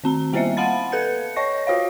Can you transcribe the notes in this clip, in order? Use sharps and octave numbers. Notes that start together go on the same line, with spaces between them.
D#3 C4 A#5
G3 A#3 B3 C5 D#5 E5
F5 F#5 A5 B5 A6
A4 B4 G6 C#7
C#5 D#5 C#6 A#6
F4 F#4 C#5 F5